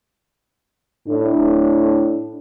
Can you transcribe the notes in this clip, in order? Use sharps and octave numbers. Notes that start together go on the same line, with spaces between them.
A2 D4